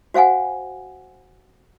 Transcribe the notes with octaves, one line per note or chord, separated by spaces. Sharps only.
F#4 C5 F5 F#5 G#5